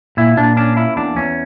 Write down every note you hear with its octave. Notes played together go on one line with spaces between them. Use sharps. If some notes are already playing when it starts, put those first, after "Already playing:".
A#2 E4
A#2 D4
C#4 D4
A#3 E4
E2 D4
E2 C#4